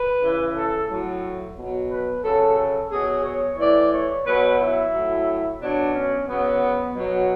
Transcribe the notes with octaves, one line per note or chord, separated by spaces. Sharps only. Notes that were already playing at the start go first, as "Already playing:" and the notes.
Already playing: B4
C#3 E3
A4
A2 F#3
B2 F#3
B4
C#3 F#3 A4
A4
B2 F#3 G#4
C#5
A2 E3 D5
C#5
B2 F#3 B4
E4
A2 F#3
B2 F#3 D4
C#4
C#3 F#3 B3
B2 F#3